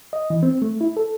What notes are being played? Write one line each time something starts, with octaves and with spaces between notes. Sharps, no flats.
D#5
E3
C4
A3
E4
A4